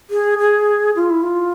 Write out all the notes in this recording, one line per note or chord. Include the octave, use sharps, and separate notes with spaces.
G#4
G#4
F4
E4
F4